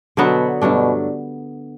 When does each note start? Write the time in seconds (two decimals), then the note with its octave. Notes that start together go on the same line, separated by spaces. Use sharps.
0.17 B2 D3 F#3 B3 F#4
0.62 G2 B2 F#3 A3 D4